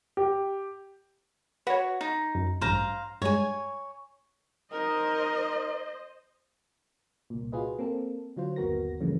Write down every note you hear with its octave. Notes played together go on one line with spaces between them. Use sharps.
G4
F#4 B4 C#5
D#4
F#2
A1 G2 C5 F5 A#5
G2 G#3 C#5 G#5
D#4 A#4 C5 D#5
C2 A#2
F4 F#4 G#4 B4 D#5
A#3 C4 A4
D3 F#3 F4 C5
G1 D#2 B3 F#4 A#4 A#6
G2 C#3 E3 F3 A3 A#3